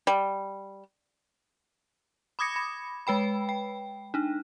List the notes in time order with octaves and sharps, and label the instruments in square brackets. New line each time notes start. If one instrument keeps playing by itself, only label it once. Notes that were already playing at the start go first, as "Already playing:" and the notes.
[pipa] G3
[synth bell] B5 D6 D#6 G#6 A#6 C#7
B5
G#3 B4 G5 B5
G5
D4 D#4